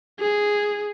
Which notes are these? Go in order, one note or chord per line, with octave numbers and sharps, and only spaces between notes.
G#4